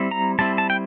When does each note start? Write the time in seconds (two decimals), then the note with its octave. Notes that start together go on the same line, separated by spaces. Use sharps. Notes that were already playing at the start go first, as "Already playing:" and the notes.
Already playing: G3 C4 E4
0.11 A#5
0.39 G3 C4 E4 A5
0.58 A5
0.70 G5